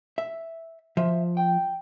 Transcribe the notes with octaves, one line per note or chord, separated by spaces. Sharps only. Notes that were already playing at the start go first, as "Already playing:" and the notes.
E5
F3 E5
G5